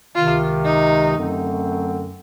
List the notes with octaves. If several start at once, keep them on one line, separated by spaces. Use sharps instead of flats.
C#2 C3 D#3 F4
D#4
F#2 D3 F#3 A3 C4